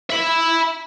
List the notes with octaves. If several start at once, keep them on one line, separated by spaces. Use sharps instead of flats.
E5 B5